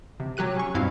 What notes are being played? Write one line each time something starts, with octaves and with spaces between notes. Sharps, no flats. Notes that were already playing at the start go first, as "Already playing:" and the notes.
C3
F#3 G4 F#6 D#7
C#4 C#6
G2 B2 C4 E4 F5